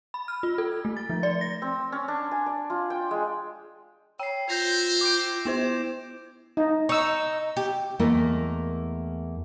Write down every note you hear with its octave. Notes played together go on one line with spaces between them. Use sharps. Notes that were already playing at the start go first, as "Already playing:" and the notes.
B5
F6
F4
A4
A3
A6
F3
D5
A#6
C4
C#4
D4
G#5
D5
F4
G5
G#3
C#5 G5 E6 C7
E4 F4 C5 G6 A#6 F7
D6 G6 D7
B3 E4 C5 E7
D#4
D#4 C#6 E6
G4
E2 A3 A#3 E4 A#4 D#5